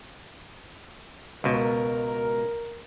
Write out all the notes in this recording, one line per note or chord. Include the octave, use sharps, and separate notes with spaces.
C#2 B2 A#4